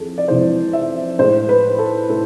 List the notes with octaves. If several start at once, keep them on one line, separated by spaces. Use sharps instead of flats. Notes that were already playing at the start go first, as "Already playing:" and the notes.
Already playing: F2 E3 G#4 A4
D5
F2 E3 G#3 C5
E5
A2 G#3 C5
B4
A4
A2 A4